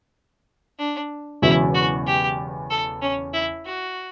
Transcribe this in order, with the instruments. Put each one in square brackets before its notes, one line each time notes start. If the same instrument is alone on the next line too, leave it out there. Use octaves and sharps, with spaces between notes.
[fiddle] D4
[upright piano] E1 E2 C#3 F#3 [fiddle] E4
[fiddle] F#4
G4
A4
C#4
E4
F#4